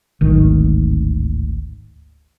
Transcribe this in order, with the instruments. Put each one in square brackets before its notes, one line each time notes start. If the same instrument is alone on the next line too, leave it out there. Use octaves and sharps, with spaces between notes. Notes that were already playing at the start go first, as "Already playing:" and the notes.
[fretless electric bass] D1 G#1 D#3